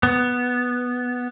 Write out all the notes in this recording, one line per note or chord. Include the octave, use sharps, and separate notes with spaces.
B3